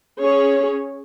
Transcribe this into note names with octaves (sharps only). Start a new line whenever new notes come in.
C#4 G#4 C#5